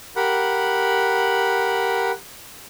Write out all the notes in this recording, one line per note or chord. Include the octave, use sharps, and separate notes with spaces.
G4 A#4 F#5 B5